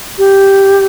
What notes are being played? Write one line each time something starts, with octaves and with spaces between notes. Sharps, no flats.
G4